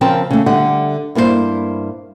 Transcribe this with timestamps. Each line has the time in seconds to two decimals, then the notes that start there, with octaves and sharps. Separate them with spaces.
0.01 C#3 F3 C4 A#4 G5 A5
0.31 C#3 A3
0.46 D3 G3 E5 F#5
1.15 G2 A#3 E4 G4 C5